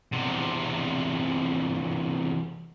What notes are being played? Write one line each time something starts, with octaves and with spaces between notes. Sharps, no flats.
E2 C3